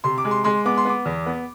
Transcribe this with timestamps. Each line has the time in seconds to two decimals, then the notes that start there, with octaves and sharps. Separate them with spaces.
0.04 C3 C6
0.18 D6
0.24 G#3
0.31 C6
0.44 G#3 C6
0.65 B3 D6
0.77 C6
0.85 B3 D6
1.05 E2
1.26 B3